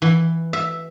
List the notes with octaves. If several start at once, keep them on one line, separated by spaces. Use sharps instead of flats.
E3
E5